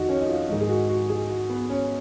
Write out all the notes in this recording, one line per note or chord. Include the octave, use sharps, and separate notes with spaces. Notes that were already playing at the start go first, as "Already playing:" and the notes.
Already playing: F2 D#3 D#4 F#4
C#4
D#4
F4
G#2 D#3 G#3 D#4
G#4
F#4
F#4
G#4
F#4
B3
C#4